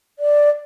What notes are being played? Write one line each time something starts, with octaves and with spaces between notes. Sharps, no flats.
D5